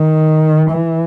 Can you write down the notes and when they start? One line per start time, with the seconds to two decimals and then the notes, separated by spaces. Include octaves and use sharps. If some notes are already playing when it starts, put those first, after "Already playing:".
Already playing: D#3
0.71 E3